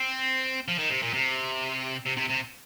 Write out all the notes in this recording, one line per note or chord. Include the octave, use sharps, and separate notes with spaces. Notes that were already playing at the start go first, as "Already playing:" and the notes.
Already playing: C4
F3
D#3
C3
A#2
C3
C3
C3
C3